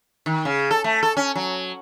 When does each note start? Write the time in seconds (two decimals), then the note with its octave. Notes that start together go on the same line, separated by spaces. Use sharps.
0.26 D#3
0.45 C#3
0.71 A4
0.84 A3
1.03 A4
1.17 C#4
1.36 F#3